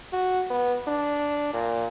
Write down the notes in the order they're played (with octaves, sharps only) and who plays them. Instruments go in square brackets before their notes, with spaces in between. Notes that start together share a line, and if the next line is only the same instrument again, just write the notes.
[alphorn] F#4
B3
D4
A#2